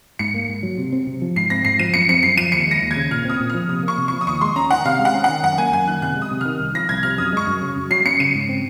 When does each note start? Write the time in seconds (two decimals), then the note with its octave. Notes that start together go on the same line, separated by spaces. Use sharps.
0.19 G#2 C#7
0.34 A#3
0.49 G#2
0.63 F#3
0.78 C3
0.92 C4
1.07 C3
1.22 F3
1.36 G#2 C7
1.50 C4 A#6
1.65 G#2 C7
1.79 F3 D#7
1.94 F#2 C#7
2.09 C4 C#7
2.23 F#2 C7
2.37 F3 D#7
2.52 D#2 C#7
2.67 G#3 A#6
2.81 D#2
2.91 G#6
2.96 C#3
3.11 A#2 F6
3.25 C4 D#6
3.40 A#2
3.50 F3 F6
3.68 C3 D#6
3.83 A#3 C#6
3.98 C3
4.08 F3 C#6
4.21 D#6
4.27 D#2 C#6
4.41 G#3 C6
4.56 C#4 A#5
4.71 D#3 F#5
4.85 C3 F5
4.99 G#3
5.05 F#5
5.15 C#4
5.24 D#3 F#5
5.43 F#2 F#5
5.58 A#3 G#5
5.73 F#2 G#5
5.87 D#3 F#6
6.02 C3 F#6
6.16 G#3
6.22 D#6
6.31 C3
6.41 D#3 F6
6.60 C2
6.75 F3 A#6
6.89 C2 G#6
7.03 C3 F6
7.18 F#2 D#6
7.33 G#3 C#6
7.47 F#2
7.61 C#3
7.77 F#2
7.91 F#3 C7
8.06 C#4 C#7
8.20 C#3 D#7
8.35 G#2
8.49 C4